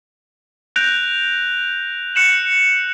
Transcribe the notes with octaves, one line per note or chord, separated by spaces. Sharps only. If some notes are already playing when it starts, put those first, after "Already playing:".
F#6 G6 A#6 D7 F7
F#6 C#7 E7 F#7